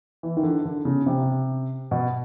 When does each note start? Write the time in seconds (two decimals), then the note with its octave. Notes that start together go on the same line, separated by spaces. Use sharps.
0.23 E3
0.37 D#3
0.43 D3
0.65 D3
0.85 C#3
1.06 C3
1.91 B2